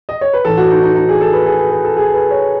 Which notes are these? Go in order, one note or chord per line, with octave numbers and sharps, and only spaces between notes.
D#5
C#5
B4
A2 E3 A4
F#4
D#4
D#4
D#4
G#4
A4
B4
G#4
B4
B4
A4
G#4
B4
C#5